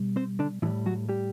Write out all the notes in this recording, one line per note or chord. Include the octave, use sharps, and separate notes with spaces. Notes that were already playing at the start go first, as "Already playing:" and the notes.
Already playing: B2 G3
C4 C5
D3 D4
A2 E3 G3 E4
F#3 F#4
G3 G4